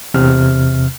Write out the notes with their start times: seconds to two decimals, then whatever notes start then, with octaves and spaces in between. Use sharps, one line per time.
0.14 E2 C3 F6